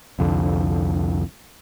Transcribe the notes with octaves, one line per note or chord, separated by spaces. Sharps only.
C2 F2 D3